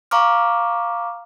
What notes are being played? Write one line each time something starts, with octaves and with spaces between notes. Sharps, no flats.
F5 A#5 C#6 D6 F6